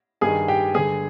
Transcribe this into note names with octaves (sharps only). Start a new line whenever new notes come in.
G2 D#3 G#4 G#5
G4 G5
G2 D3 G#4 G#5